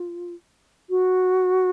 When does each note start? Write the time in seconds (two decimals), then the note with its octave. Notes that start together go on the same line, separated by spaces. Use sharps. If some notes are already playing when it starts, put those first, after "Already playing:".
Already playing: F4
0.90 F#4